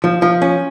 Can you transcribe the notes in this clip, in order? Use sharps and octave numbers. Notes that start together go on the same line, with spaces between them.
F3
F3
C#4